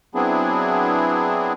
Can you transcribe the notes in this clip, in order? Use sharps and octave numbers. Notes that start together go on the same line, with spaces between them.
F#3 B3 C4 D4 E4 G#4